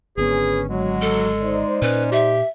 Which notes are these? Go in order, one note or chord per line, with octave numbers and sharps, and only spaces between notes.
G#1 D3 B3 C#4 G#4 B4
F#3 G#3
A4
D#4 C5 D5
A#2 C#4 B4
G4 E5